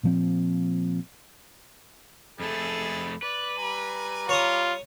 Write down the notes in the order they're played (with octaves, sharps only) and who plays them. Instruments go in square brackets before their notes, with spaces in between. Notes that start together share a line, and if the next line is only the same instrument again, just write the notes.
[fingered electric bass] A#2 F3 C4
[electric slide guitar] F2 A3 [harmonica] G#4 A4 B5
[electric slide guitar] B4 [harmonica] D5
[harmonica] G3 G#5 A#5
[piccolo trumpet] F4 [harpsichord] C#5 D#6